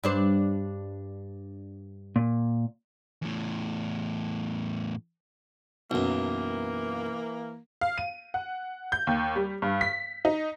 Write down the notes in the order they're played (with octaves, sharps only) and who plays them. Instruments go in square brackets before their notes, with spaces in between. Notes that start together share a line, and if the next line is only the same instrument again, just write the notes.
[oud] G2 D4 C5
[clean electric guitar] A#2
[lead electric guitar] E2 A2
[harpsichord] B1 F#2 [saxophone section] E3 A#3
[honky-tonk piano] F5
D#7
F#5
G6
D#2
G3
G2
B6
D#4